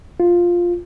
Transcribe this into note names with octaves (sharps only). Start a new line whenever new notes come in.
F4